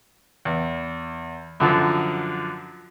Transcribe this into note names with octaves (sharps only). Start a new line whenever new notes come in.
E2
F#2 D3 F3